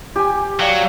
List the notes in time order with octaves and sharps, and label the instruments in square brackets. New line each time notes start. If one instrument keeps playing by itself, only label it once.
[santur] G4 G#5
[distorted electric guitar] F#3 [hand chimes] D5 F5 G5